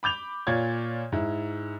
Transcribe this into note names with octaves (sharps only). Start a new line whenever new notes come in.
B5 D6 G6 F7
A#2 F4 C#5 D5 G#6
G#2 E4